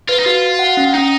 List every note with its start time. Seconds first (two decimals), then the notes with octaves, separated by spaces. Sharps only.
0.08 F4 B4
0.19 D#4
0.26 F4 F#4
0.42 F#4
0.59 F#5
0.77 C#4
0.94 C#4 D#4